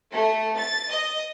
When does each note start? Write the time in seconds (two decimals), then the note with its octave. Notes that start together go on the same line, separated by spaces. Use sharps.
0.13 A3
0.58 A6
0.90 D#5